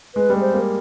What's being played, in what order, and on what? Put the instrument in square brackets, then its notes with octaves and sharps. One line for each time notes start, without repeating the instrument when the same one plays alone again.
[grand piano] G#3 [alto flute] B4
[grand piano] G3
G#3
[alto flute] C5
[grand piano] A#3